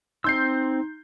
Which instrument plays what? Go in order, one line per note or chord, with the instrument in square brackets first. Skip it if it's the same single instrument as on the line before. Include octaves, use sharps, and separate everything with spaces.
[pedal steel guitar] C4 E6 [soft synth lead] D#4 [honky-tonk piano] C6 G6 C7